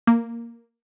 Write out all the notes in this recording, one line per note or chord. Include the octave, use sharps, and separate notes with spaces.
A#3